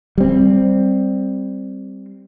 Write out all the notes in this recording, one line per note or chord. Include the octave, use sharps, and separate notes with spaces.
G3 C4